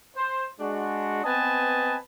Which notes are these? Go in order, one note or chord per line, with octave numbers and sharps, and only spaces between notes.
C5
G#3 D4 F#4
B3 C4 B4 D#5 G#5 A5